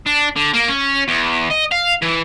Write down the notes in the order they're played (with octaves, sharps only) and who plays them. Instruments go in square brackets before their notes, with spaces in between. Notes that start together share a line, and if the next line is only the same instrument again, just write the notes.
[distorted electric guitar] D4
D3
A#3
C#4
E2
D#5
F5
E3